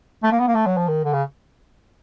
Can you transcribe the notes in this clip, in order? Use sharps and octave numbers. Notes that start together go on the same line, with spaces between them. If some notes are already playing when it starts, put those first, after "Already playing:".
A3
A#3
B3
A#3
A3
F#3
F3
D#3
D3
C#3